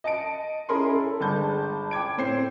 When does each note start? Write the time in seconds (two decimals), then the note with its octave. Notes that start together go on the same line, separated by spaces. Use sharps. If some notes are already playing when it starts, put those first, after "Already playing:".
0.04 D#5 A5 C#7 D7
0.69 C#4 E4 G#4 A#4 B5 C6
0.94 A4
1.20 G1 G#3 A5 G6
1.91 G5 D6 G#6 D7
2.18 A2 C4 C5 C#5 C7